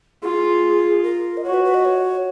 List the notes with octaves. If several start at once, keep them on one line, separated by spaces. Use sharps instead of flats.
F4 G#4
A#4
D#5
F#4 C#5
B4
B4
D#5
C#5